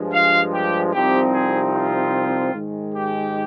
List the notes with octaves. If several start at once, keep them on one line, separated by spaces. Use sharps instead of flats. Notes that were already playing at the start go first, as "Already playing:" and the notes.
Already playing: G2 F3 G#3
F5
G4
C2 C3 F3 C4 D#4 G4
G#4
F4
G#2 D#3 G#3
G4